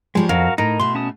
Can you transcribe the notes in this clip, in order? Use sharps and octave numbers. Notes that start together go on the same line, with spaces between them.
F3 G3 G#3 C#5
F2 F#4 A#4 F5
A2 D#4 A#4
B2 A3 C6
C#4 A5 D#6